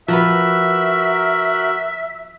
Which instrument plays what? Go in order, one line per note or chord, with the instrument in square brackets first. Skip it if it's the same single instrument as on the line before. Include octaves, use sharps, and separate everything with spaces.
[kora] F3 B4 [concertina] F#4 A#4 F#6 [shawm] E5